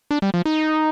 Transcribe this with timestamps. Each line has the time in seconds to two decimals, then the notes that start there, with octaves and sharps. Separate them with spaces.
0.11 D4
0.22 G3
0.34 F3
0.45 D#4